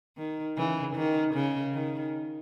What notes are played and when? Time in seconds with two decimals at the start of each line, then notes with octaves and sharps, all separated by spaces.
0.17 D#3
0.57 C#3 E3
0.96 D#3
1.34 C#3
1.74 D#3